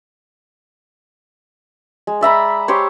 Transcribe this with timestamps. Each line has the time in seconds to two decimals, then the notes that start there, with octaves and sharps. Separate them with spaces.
2.07 G#3
2.21 D5 E5 A#5 B5
2.68 G4 C5 C#5